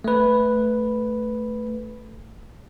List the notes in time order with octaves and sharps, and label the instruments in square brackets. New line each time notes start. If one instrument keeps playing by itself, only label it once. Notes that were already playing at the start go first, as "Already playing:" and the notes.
[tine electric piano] A3 B4